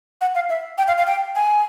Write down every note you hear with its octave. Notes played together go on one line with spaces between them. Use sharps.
F#5
F5
E5
G5
F5
F5
G5
G#5